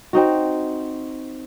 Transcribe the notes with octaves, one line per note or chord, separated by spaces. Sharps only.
C4 D#4 F#4